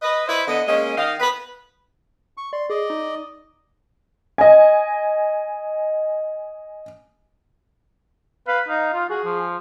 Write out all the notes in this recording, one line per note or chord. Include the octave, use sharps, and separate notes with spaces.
B4 D#5
E4 B4 C5 D5 D#5
D3 B3 D#5
G#3 A#3 C#4 D#5
D#3 D#4 D#5 F5
B4
C#6
D5 C6
G#4 D5 D#5
D#4
D#5 G#5
B4 F5
D#4 F5
F4
F#4 G#4
F3